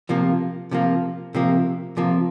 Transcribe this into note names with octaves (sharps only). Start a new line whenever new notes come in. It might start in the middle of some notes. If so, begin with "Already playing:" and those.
C3 F3 A#3
C3 F3 A#3
C3 F3 A#3
C3 F3 A#3